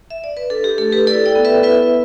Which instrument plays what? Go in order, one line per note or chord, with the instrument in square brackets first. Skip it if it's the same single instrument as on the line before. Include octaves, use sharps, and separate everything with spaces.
[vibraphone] E5
D5
B4
D4 A4
G4
A3 A4
G4 B4
E4 A4 D5
D5 G5
B3
B4 E5
E4 B4 E5